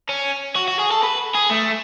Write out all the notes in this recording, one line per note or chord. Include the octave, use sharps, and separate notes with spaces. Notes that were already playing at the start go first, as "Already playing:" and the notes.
C#4
F#4
F#4
G#4
A4
B4
G#4
A3